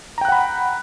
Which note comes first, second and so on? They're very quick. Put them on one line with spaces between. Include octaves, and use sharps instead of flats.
A#5 G5 F#6 F#5 B5